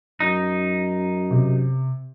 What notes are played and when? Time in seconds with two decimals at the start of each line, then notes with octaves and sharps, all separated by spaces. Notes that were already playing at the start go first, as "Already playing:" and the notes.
0.20 F#2 D#4
1.31 C3